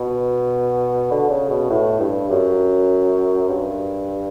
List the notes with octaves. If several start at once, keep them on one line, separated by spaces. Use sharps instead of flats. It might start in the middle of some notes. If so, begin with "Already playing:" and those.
Already playing: B2
D3
C#3
B2
A2
G2
F#2
G2